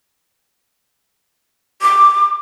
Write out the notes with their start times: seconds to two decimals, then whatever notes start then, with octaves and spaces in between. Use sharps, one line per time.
1.82 D6